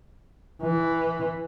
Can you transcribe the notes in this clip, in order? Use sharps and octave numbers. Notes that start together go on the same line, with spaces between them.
E3